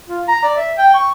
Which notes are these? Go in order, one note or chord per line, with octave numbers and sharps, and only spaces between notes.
F4
A#5
D5
E5
G5
C#6